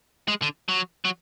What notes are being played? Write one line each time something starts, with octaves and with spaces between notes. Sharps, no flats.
G#3
D3
F#3
F#3